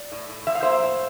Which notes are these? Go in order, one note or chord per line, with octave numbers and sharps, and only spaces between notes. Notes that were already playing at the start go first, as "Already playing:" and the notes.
Already playing: D5
A2
A2
F3 E5
F5
A#3 C5 E5
A2